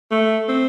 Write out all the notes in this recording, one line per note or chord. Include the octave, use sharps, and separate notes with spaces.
A3
C4